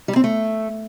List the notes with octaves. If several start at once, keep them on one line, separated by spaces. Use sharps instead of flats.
G3
C4
A3